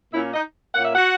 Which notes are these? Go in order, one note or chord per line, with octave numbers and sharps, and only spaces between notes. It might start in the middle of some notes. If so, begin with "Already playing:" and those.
A#2 A#3 C#4 E4 E5
D#4 D#5
A#2 A#3 C#4 F#5
E5
F#4 F#5